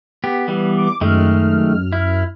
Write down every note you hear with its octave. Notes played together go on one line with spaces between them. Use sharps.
B3 G4
E3 G3 B3
D6
F#2 D#3 G#3 A3 F6
E4